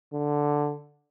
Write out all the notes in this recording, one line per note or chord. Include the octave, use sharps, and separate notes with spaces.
D3